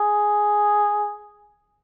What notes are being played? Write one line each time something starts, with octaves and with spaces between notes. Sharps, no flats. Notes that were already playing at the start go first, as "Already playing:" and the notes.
Already playing: G#4